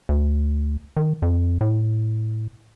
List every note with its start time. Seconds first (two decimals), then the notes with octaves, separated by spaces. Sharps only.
0.09 D2
0.97 D#3
1.22 F2
1.61 A2